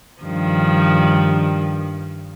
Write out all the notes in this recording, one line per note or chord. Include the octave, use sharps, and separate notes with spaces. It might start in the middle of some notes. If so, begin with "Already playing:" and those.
G2 D#3 F3